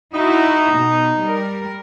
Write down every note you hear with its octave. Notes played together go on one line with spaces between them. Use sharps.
D#4 E4 F#4
B2
G3 A#4